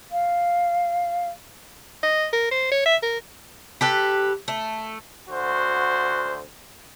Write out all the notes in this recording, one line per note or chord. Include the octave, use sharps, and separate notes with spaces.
F5
D#5
A#4
C5
C#5
E5
A#4
G4 A4 B4
A3
D2 F#4 C5